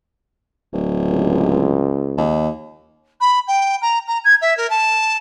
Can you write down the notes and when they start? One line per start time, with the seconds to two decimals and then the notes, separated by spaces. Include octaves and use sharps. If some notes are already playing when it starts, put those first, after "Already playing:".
0.73 D1
1.08 C#2
2.18 D#2
3.20 B5
3.48 G5
3.82 A#5
4.08 A#5
4.24 G#6
4.41 E5
4.57 A#4
4.70 A5